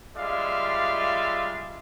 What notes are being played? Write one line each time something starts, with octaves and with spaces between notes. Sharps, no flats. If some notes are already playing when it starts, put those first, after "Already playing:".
G3 G#3 F4 D5 E5 F5